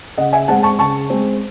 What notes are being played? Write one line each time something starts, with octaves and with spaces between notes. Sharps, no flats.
C#3 D#5 F#5
E5 G#5
G#3 C4 F#5 A5
A5 C#6
C#3 A5 C#6
G#3 C4